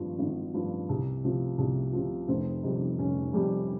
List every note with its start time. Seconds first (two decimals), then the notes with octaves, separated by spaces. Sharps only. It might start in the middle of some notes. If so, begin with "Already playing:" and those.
Already playing: G#1 G2 F3
0.19 G#1
0.54 G2 F3
0.89 C2
1.24 C3 F3
1.58 C2
1.93 C3 F3
2.28 F1 C4
2.63 F2 C3 G3 D#4
2.98 F1 C#4
3.33 F2 C3 G3